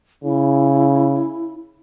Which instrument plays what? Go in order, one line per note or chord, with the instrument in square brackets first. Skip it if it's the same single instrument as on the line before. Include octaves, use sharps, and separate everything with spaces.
[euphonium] C#3 [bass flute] E4